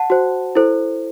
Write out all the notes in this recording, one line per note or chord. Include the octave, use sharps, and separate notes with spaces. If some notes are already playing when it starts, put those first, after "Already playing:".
Already playing: F#5 A5
F#4 C5
E4 A4 C5